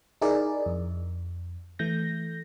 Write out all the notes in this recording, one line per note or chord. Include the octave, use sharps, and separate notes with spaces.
D#4 E4 G#4 A#4 D5
F2
E3 A3 G6 A#6